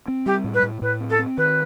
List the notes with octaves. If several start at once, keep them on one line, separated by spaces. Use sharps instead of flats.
C4
G3 G4
A2
B4
A2
A2 B4
C4
A4
C4
D#3 B4